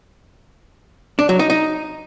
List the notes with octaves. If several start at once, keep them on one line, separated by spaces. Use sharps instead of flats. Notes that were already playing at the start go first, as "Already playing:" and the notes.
D4
F#3
D#4
D#4